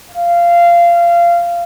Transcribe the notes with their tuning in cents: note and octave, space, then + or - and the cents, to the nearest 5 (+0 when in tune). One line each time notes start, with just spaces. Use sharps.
F5 -20